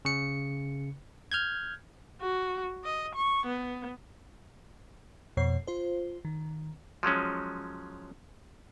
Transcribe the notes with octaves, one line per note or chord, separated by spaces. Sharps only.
C#3 C#7
F6 G6 G#6
F#4
D#5
C#6
B3
F2 B2 C#5 C7
F4 C5
D#3
F3 F#3 G#3 C#4